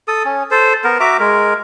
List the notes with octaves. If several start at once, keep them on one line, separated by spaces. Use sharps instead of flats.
A4 D#6
C#4
A4 C5
B3 A#4
F#4 E5 A#5 D6
G#3 A#4